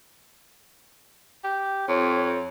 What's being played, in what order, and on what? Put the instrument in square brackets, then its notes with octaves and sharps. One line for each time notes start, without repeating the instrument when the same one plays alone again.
[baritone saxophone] G4
[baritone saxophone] F2 [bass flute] C#5